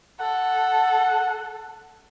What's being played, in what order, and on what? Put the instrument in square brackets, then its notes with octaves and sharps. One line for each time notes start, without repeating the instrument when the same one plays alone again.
[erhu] A4 [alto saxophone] F#5